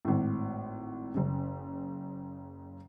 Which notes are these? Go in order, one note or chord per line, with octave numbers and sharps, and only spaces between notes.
G#1 A2
F#1 C#3